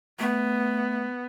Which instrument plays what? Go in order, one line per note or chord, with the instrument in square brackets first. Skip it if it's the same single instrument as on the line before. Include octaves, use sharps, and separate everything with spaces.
[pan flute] A3 [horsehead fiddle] B3